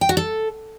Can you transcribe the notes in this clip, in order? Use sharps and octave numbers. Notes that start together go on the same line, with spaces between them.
G5
F#4
A4